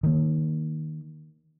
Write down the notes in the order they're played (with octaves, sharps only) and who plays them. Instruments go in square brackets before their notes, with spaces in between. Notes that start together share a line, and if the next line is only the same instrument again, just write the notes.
[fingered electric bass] D#3 A#3